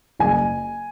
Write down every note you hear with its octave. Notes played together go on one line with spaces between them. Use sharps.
F#1 G#5